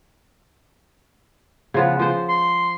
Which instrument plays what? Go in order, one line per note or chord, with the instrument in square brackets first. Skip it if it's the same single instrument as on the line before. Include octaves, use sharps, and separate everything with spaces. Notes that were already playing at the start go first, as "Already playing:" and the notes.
[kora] C#3 F3 B3
F3 C5
[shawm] C6